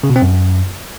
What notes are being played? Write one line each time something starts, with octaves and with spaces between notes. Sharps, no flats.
C#3
B2
C4
F#2